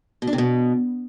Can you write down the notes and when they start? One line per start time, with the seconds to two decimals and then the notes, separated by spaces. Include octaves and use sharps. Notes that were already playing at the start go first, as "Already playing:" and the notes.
0.22 B2
0.27 D4
0.33 C3
0.38 B2